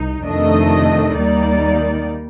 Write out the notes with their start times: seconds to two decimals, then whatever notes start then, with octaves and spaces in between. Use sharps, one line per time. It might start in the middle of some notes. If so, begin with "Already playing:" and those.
Already playing: C2 D#4
0.26 F2 C3 D#3 A3 D4 D#5
1.16 D#2 D#3 G3 A#3 D#4 D5